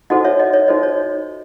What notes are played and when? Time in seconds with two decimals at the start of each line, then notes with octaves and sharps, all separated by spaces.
0.10 D#4 F#4 A4 C5 D#5 F#5
0.24 C#5 E5
0.39 D#5
0.53 C#5 E5
0.68 D#4 F#4 A4 C5 D#5
0.83 C#5